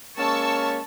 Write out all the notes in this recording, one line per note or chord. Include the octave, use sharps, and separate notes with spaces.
G#3 A#3 C#4 A5 C#6 E6